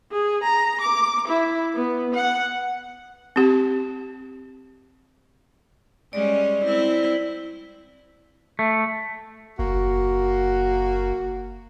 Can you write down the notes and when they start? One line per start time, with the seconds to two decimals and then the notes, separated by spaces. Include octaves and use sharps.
0.12 G#4
0.44 A#5
0.81 D6
1.28 E4
1.74 B3
2.14 F#5
3.36 C4 G4
6.13 G3 G#3 C#4 D5
6.65 C4 E4
8.59 A3
9.59 F#1 A#3 F#4